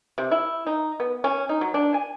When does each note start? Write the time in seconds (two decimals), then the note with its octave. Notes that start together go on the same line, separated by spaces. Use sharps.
0.18 C3
0.31 E4
0.67 D#4
1.00 B3
1.24 C#4
1.49 D#4
1.61 F#3
1.74 D4
1.94 G#5